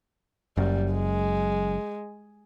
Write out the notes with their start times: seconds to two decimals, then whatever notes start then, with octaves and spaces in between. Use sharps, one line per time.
0.57 F#1 F#2 G3
0.93 G#3